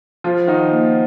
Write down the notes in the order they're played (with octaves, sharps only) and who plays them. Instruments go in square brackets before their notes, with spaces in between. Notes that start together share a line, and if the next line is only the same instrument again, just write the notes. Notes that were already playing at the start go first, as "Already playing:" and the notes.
[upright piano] F3 F4 [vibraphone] C5
[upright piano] D#3 D#4 [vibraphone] F#5
[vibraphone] A#3